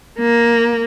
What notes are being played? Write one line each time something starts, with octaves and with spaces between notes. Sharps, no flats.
A#3